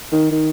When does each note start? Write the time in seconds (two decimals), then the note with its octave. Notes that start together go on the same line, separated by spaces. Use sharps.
0.12 D#3
0.31 D#3